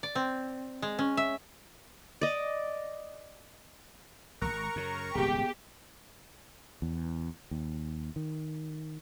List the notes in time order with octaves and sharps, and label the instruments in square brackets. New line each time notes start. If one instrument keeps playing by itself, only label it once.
[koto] D5
C4
G#3
C#4
E5
[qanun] D5 D#5
[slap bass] D#1 G#1 [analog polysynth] A#4 A#5 C#6 [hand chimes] F#6
[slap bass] F#2 C#3
[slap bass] D#1 G#1 C#2 [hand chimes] B3 G#4 [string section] G4
[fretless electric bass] E2
D#2
D#3